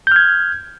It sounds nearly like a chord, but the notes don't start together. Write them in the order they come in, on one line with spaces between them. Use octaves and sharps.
G6 F6 G#6